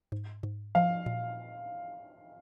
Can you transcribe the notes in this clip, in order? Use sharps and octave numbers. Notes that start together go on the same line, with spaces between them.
G#2
G#2
F3 F5
A#2